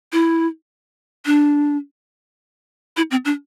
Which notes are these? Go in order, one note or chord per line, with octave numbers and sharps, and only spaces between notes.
E4
D4
E4
C4
D4